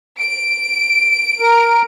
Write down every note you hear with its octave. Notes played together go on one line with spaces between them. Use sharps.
D7
A#4